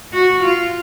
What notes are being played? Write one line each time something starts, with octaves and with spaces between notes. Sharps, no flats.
F#4
F4